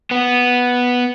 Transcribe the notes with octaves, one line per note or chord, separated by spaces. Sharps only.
B3